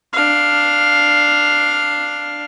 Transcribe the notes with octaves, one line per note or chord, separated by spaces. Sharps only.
D4 F5